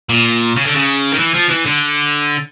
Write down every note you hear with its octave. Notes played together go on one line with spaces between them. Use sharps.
A#2
C#3
D3
C#3
D#3
E3
F3
E3
D3